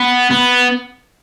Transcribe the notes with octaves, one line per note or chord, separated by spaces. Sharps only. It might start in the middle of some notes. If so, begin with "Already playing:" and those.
Already playing: B3
B3